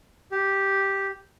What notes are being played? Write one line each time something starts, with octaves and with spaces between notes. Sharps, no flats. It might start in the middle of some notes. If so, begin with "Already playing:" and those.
G4